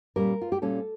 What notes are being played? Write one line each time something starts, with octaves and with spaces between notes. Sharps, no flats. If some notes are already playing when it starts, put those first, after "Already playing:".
A#2 G3 C#4 A#4
F4
G4
A#2 G3 C#4 A4